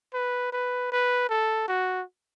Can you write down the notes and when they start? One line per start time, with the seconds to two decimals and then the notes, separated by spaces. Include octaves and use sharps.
0.14 B4
0.53 B4
0.92 B4
1.29 A4
1.68 F#4